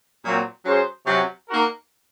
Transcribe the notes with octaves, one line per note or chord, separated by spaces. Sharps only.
A#2 F#3 C4
F#3 C#4 G#4 C5
C3 F#3 C#4
A#3 D#4 F#4 A#4